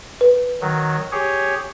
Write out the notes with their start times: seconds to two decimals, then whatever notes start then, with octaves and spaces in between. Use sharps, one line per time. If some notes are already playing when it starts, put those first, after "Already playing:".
0.21 B4
0.61 D#3 F#3
1.12 G4 G#4 C#5